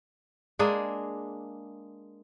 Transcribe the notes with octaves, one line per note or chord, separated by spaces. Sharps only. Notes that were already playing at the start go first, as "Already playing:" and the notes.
G#3 A#3 D4 G#4